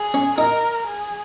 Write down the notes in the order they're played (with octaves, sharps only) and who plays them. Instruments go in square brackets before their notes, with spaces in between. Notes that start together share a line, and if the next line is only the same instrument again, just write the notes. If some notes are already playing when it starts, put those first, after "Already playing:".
Already playing: [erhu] G#4
[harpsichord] C#4
[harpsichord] D#4 [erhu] A#4
[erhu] G#4